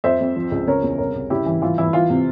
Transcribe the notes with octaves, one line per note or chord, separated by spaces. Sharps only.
F2 C5 E5
F2
F3
C#2
C#3 A#4 C#5
E2
C2 A#4 C#5
C2
C#3 E4 G4
E3
E3 F4
E3 E4
E3 F4
C3